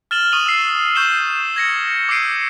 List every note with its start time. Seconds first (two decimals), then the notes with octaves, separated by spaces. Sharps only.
0.11 F6 A6 E7 F#7 G7
0.32 C#6 D#6 D#7 F7 F#7
0.46 E6 C7
0.95 C#6 G6 C7 E7 G7
1.56 G#6 A#6 C#7
2.09 D6 E6 G6 C7 D7 D#7